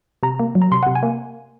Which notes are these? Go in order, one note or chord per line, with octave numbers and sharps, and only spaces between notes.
C3 A#5
A#3
F#3
A#5
C3 C6
C3 F#5
G#5
A#3